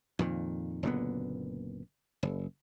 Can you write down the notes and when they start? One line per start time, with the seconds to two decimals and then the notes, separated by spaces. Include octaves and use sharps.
0.19 F2 A#2 D#3
0.83 F#1 A#2 D3 B3
2.23 F#1